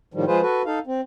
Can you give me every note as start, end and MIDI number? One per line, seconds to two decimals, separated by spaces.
0.14 0.25 45
0.14 0.25 51
0.14 0.25 53
0.14 0.25 55
0.27 0.41 53
0.27 0.41 56
0.27 0.41 65
0.27 0.41 68
0.27 0.41 71
0.27 0.41 72
0.42 0.62 66
0.42 0.62 69
0.42 0.62 71
0.66 0.79 63
0.66 0.79 69
0.66 0.79 77
0.87 1.01 60